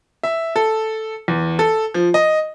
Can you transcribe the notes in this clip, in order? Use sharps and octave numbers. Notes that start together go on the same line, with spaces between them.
E5
A4
E2
A4
F3
D#5